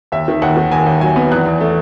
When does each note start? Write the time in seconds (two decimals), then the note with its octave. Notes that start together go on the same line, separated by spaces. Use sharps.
0.12 D#2 E5
0.28 D#3
0.42 D#2 F#5
0.57 D#3
0.72 D#2 G#5
0.86 D#2
1.01 F#3 G#5
1.16 B3
1.31 E2 F#6
1.46 E2
1.61 A3